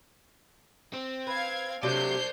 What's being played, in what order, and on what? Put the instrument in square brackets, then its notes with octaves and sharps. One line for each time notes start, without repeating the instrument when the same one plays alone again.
[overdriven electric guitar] C4
[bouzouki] B4 [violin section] F5 G#6
[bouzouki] C3 F#3 A3 [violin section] D4 G6 C7 [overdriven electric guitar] C5 D5